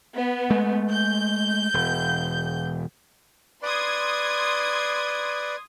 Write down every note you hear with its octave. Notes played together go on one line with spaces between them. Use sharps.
B3
G#3 A3
G6
E1
B4 D5 C6 D#6 G#6